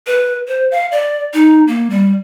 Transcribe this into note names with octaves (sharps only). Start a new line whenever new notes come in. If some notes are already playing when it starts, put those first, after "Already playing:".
B4
C5
F5
D5
D#4
A#3
G3